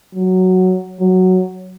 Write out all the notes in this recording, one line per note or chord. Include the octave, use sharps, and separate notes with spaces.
F#3
F#3